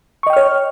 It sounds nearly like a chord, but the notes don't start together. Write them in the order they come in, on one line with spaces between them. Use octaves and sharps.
C#6 D#5 G5 F6 C#5